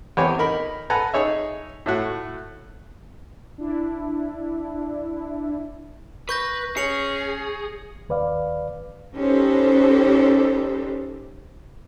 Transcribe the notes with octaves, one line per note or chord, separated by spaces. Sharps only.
E2 C4 G4 B4 C#5 G#5
D#4 A#4 B5
A4 B4 F#5 G#5 A#5
D#4 G#4 C#5 E5
A2 A3 F#4
D4 E4
B4 C#6 G6 A#6
C#4 G#4 C#7 F7 F#7
D#2 B4 D5 F5
C#4 D#4 G4 A4 B4 C5